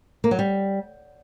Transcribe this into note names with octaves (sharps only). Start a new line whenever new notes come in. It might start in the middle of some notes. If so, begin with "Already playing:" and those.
A#3
F#3
G3